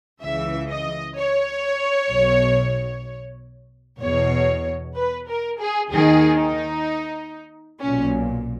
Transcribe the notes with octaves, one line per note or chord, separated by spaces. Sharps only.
C#2 C#3 E3 E5
D#5
C#5
B1 B2
E2 B2 C#5
B4
A#4
G#4
D#2 D#3 G#4
D#4
B1 A#2 C#4